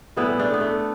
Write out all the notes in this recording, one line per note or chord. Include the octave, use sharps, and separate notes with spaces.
A2 E3 G3 B3 E4
A3 D4
B3
A3